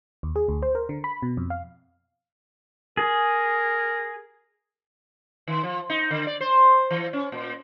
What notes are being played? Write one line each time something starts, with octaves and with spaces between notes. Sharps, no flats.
D#2
G#4
D2
C5
A#4
D3
B5
B2
F2
F5
G#4 A#4
D#3
F3
D#4
D3
D5
C5
E3
C#4
A#2